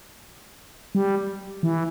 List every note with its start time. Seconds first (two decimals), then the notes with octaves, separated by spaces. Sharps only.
0.95 G3
1.63 E3